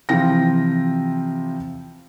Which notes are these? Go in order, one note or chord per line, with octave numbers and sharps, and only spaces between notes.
C3 E3 F3 F4 G5 A#6